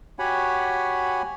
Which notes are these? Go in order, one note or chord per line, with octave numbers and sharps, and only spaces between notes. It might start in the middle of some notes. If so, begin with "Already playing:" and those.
F#4 G4 C#5 F#5 G#5 B5